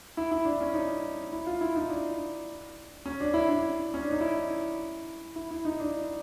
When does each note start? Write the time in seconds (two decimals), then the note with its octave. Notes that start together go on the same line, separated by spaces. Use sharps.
0.17 E4
0.31 E4
0.45 D4
0.61 C#4
0.74 D#4
1.33 E4
1.47 F4
1.61 E4
1.76 D#4
1.90 D4
3.06 C#4
3.20 D4
3.34 E4
3.49 D4
3.94 C#4
4.03 D4
4.11 D#4
4.21 E4
5.36 E4
5.51 E4
5.65 D#4
5.80 D4